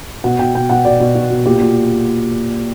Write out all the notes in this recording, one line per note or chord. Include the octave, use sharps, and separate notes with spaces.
B2 F#5
B2 G5
B2 G5
B2 F#5
B2 D5
B2
B2 F#4
B2
A#2 G4
A#2